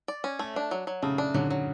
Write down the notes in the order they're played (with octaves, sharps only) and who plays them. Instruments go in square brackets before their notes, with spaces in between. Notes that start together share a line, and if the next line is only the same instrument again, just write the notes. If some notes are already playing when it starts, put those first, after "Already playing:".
[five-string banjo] D5
C#4
A3
D4
F#3
F#3
[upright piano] C#3 [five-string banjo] A3
[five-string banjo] D4
[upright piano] D3 [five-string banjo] F#3
[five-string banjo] F#3